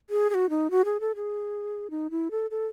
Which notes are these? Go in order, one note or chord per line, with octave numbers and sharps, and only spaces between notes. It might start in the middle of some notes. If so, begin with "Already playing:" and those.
G#4
G#4
F#4
D#4
F#4
G#4
A4
G#4
D#4
E4
A4
A4